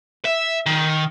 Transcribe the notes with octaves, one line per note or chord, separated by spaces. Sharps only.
E5
D#3